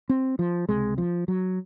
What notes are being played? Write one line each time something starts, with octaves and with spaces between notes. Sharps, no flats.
C4
F3
C#2 C3 G#3
F3
F#3